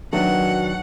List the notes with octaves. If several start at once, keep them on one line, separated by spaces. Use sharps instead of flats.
D#3 F#3 D4 F#4 B4 E5 F#5